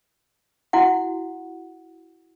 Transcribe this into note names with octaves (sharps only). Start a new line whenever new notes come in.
E4 F#4 F#5